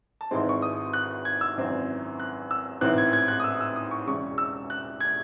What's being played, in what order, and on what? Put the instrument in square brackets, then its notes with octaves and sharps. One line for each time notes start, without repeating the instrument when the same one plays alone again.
[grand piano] A5
G#1 G#2 E3 G#3 C4 C6
C#6
D#6
F#6
G#6
E6
G#1 F#2 E3 C4
F#6
E6
A1 G#2 E3 C4 F#6
G#6
G#6
F#6
D#6
E6
E6
D#6
C#6
E1 E2 C#3 C#6
E6
F#6
G#6